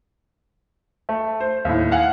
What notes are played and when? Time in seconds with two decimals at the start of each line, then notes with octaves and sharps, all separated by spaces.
1.09 A3
1.40 C5
1.65 D#2 A2
1.91 F5 F#5 G#5